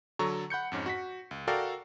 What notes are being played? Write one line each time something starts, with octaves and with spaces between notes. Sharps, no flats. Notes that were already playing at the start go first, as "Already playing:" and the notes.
D3 F#3 A4 A#5 C#6
F#5 B5 G6 C#7
F2 G#2 C#4
F#4 B6
C#2
F#4 A4 A#4 D5 F5 G5